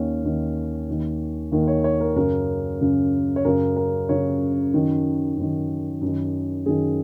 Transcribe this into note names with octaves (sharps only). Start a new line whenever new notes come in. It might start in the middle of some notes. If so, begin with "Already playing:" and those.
Already playing: D#2 D#3 C#4
D#2 D#3
D#2 D#3
D#2 D#3 A#4
C#5
C#5
A#4
F#2 C#3 A#4
F#2 C#3
C#5
F#2 C#3 A#4
A#4
F#2 C#3 C#5
F#2 D#3
F#2 D#3
F#2 D#3
F#2 D#3 G#4